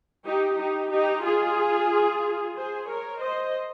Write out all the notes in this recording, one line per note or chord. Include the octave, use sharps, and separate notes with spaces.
D#4 G4
D#4 G4
D#4 G4
F4 G#4
G#4 C5
A#4 C#5
C5 D#5